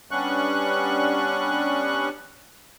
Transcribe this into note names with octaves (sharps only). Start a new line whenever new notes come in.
G3 B3 C#4 D4 C#6 F#6